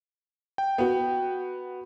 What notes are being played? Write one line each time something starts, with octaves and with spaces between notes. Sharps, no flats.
G5
B3 F#4